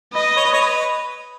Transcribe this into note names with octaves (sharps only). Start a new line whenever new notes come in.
B4 D#5
C#5
B4
C#5
B4